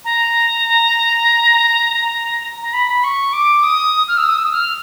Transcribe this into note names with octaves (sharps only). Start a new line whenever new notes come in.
A#5
A#5
B5
C#6
D6
D#6
F6
E6
D#6
E6
F6